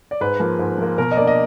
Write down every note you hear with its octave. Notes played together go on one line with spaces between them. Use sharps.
D5
G#2 B4
F3 A#3
G#2
F3 A#3
B2 A#4
D#5
A#3 D4 D5
D#5